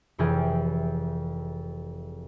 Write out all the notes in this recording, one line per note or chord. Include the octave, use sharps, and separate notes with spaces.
F1 F2 E3 G4 G#4 F6